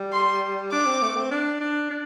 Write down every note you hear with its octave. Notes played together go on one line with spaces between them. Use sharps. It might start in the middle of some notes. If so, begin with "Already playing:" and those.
Already playing: G3
C6
D4 D6
C4
A3
C4
D4
D4
D4